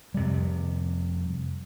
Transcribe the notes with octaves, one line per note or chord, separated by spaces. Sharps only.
F2 C3 G3